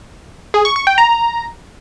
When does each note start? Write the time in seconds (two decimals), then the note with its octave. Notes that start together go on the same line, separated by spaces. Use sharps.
0.54 G#4
0.65 C#6
0.76 C#6
0.87 G5
0.98 A#5